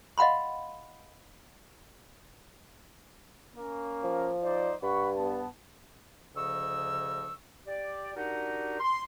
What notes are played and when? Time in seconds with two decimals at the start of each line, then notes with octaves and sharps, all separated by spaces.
0.18 D#5 F5 F#5 B5 C6
3.55 A#3 C#4
4.03 F3
4.43 D#4 C5 D5
4.83 G2 F#5 B5 C#6
5.16 B3 A5
6.35 D2 C#3 F3 D#5 C#6 E6
7.65 G4 D5
8.15 D4 D#4 F#4 G4 A#4 F#5
8.79 C6